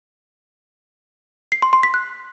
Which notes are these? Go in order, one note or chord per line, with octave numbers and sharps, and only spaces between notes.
C7
C6
C6
B6
F#6